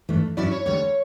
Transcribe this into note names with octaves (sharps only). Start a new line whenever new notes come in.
G2 E3 A3
G2 F#3 C#4 E4 D5
C#5
D2 D3 G3 C#5